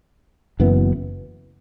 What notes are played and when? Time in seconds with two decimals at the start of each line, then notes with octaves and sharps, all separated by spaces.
0.60 F#1 F#2 E3 B3